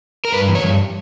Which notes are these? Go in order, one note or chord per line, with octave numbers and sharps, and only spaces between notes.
A#4
G2 B4
E3
C#5
G2